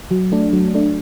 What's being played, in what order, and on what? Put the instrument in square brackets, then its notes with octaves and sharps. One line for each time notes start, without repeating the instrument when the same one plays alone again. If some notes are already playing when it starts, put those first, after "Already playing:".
[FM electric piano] F#3
A3 D4
F#3
A3 D4